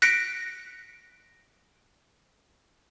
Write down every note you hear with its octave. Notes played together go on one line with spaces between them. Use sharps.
F#6 A#6 B6 C#7 D7